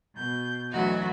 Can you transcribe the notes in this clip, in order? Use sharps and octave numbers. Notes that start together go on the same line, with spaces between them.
B2 G6
D2 E3 F#3 F#4 D#5